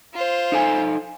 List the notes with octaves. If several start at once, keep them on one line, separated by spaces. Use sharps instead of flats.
F4 C5
D#4 A4 G#5